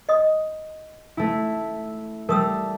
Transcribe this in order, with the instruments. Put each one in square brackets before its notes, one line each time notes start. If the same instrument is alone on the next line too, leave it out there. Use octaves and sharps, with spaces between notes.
[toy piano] D#5 D#6
[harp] A3 E4
[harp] G3 A3 [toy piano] A#4 D#6 E6